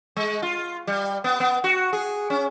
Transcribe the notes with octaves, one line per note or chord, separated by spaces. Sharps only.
G#3
F4
G3
B3
B3
F#4
G#4
C#4